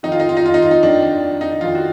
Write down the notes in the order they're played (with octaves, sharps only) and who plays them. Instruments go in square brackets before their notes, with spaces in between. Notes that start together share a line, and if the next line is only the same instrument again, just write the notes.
[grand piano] F2 D#3 D#4
F4
D#4
F4
D#4
F4
D#4
F4
D#4
F2 D#3 D4
D4
D#4
F2 D#3 F4
F#4